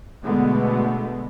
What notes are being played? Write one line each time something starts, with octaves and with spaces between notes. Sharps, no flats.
B2 D3 G#3 A3 B3